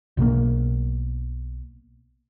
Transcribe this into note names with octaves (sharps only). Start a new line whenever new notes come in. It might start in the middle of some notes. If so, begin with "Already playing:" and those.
B1 B2 G3 A#3